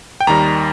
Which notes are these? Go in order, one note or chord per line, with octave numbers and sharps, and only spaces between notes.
G5
D#2 D#3 G3 A#5